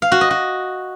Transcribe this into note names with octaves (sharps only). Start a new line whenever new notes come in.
F5
F#4
D#5
F#4